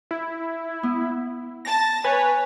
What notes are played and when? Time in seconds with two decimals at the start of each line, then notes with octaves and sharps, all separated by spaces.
0.11 E4
0.83 B3
1.65 A5 A6 A#6
2.04 B4 C#5 G#5